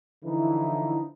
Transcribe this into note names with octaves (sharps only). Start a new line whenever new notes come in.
D3 E3 F3 D#4 E4